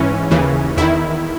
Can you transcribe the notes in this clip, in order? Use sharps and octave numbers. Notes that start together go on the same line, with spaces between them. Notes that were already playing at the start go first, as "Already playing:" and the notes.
Already playing: G#2 E3 C#4
D#2 C#3 E3
E2 D#3 E4